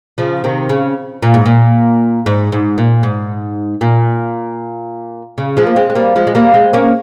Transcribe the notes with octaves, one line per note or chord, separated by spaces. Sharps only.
C#3 F3
C3 D#3
C#3
A#2
G#2
A#2
G#2
G#2
A#2
G#2
A#2
C#3
F3 G#3
A#3
G#3 C4
G#3
G3 A#3
F3 G#3
G#3
G3 A#3
G#3 C4
A#3 C#4